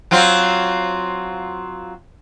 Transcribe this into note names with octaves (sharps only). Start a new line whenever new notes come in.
F#3 C4 F4